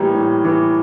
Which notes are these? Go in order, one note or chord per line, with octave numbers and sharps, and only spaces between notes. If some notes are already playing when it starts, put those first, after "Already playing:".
Already playing: A2 E3 G3 A#3
A2
E3